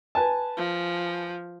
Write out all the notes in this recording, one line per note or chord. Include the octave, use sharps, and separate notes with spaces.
B4 G#5 A5
F3